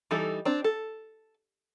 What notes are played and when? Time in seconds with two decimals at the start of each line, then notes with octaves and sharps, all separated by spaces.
0.11 E3 G3 D#4 A4
0.45 C4 D4
0.64 A4